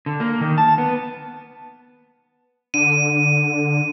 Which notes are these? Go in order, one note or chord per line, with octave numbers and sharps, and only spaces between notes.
D3
A#3
D#3
A5
B3
D3 D#7